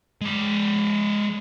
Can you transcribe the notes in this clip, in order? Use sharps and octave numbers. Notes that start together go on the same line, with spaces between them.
G#3 D5